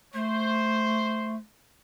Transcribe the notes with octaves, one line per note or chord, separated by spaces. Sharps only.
A3 C5